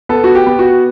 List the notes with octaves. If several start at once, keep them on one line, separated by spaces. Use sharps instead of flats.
B3 A4
F#4
G4
B3
F#4